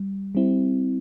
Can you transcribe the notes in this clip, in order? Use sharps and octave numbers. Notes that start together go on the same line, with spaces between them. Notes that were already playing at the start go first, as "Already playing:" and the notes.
Already playing: G3
G3 C4 E4